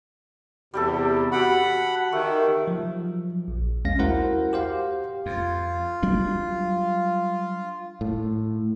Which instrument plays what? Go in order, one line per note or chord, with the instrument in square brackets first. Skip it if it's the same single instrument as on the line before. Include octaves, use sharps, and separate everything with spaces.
[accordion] E2 C3 [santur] G3 G4 A4
[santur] F#4 G5 [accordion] F#5 B5
[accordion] D#3 [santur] A3 G4
[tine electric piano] F3 F#3
A#1
D#2 G#3 C#4 F5 A#6
E4 F#4 A#4 C5 F#5
G4 C5 F5
[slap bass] F2 [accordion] F4
[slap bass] F#3 G3 D4
[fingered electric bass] A2